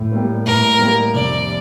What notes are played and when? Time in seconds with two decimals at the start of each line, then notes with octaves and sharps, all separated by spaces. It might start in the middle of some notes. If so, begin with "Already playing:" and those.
Already playing: A2
0.12 G3 A#3
0.46 A2 A#4
0.79 G3 A#3
1.14 F1 D5